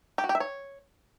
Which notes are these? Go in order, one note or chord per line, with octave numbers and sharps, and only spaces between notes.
G4
F#4
G4
E5
C#5